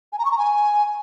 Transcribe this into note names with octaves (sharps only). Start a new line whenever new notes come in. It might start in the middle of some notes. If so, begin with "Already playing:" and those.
G#5
A#5
C#6
A#5
G#5